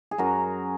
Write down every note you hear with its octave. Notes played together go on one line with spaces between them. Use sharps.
G#4
F#2 F#4 A#4